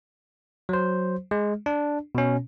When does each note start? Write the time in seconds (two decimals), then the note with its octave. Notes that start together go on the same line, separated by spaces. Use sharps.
0.69 F#3 C5
1.31 G#3
1.66 D4
2.15 B2 C#4